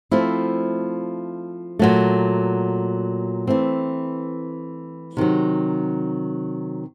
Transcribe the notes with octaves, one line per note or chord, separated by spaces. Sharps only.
F3 A3 C4 E4
A#2 F#3 A3
E3 A3 C4
C3 D#3 F#3